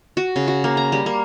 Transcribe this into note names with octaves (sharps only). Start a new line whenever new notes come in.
F#4
C#3
F#4
A#3
A#5
G3
A#3